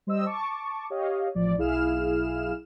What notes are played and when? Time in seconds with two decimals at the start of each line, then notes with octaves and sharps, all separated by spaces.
0.07 G3 C5 D#5 E6
0.26 A5 C#6 D6
0.90 G4 C#5 D#5 F5
1.35 A1 F3 D5
1.58 B1 E4 G#4 F5 F6 E7